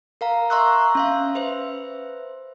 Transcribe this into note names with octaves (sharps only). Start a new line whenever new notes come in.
A#4 F5 A#5
E5 A#5 C6 C#6 E6 F#6
C#4 E5 F5
B4 C5 E5